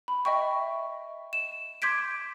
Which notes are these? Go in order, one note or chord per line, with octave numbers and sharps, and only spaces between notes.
B5
D#5 E5 G5 C#6
E7
C6 D6 G6 G#6 B6 D7